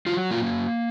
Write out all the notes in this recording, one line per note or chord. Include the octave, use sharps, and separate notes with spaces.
F#3 F4
A#3 F4